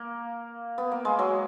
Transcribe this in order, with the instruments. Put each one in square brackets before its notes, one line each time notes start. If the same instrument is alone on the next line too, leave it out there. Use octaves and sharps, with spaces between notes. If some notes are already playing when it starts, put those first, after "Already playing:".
Already playing: [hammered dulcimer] A#3
B3
A#3
G#3
F#3